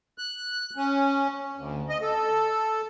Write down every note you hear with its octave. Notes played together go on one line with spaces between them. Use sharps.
F#6
C#4
D2
D#5
A4